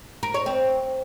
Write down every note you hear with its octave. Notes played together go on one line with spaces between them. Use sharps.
A#4
C#5
C4